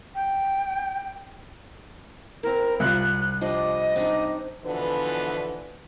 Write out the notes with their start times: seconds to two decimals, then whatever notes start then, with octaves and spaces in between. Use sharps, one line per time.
0.15 G5
2.43 C4 E4 A#4
2.80 C2 F4 F#6
3.41 F3 G3 D4 D#5
3.96 C4 D4 D#4
4.64 B2 D3 E3 F3 B3 B4